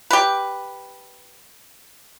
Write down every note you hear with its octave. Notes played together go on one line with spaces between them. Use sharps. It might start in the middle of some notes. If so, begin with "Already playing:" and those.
G4 B4